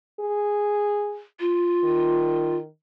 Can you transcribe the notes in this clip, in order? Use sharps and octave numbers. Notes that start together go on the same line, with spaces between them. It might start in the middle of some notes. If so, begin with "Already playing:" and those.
G#4
F4
D#3